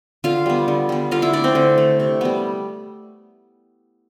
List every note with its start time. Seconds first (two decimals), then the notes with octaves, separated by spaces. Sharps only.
0.24 D3 F4 F5
0.46 G3 B3
0.68 D3
0.89 G3 B3
1.11 D3 F4 F5
1.22 E4 E5
1.33 A3 D4 D5
1.44 C4 C5
1.55 D3
1.78 A3
2.00 C3
2.21 G3 B3